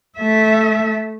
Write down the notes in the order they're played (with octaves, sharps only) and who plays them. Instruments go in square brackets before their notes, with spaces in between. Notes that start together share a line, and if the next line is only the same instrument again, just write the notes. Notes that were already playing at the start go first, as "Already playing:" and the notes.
[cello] A3 E5